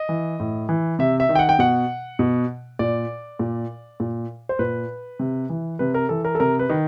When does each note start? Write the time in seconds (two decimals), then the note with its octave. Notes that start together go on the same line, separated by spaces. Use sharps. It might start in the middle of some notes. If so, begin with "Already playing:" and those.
Already playing: D#5
0.09 E3
0.40 A2
0.69 E3
0.99 C3 E5
1.20 E5
1.29 D#3
1.35 G5
1.39 F#5
1.49 G5
1.59 B2 F#5
2.19 B2
2.79 A#2 D5
3.39 A#2
4.00 A#2
4.49 C5
4.59 A#2 B4
5.19 C3
5.50 E3
5.79 C3 B4
5.94 A#4
6.09 E3 A4
6.25 A#4
6.35 A4
6.40 C3 A#4
6.59 B4
6.69 D#3